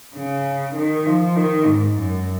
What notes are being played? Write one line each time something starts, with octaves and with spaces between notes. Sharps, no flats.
C#3
D#3
F3
D#3
G#2
F#2